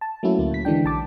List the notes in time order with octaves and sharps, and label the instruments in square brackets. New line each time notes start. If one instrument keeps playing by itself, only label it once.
[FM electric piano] A5
F#3 A3 A#3 C#4 E4 F#4
D2 A#3
A#2 B6
D3 E3 G#3 D4 G5
A#1 A5 D6